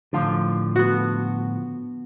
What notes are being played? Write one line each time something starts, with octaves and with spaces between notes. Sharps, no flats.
A2 D3 F3 F4 F5
B3 F#4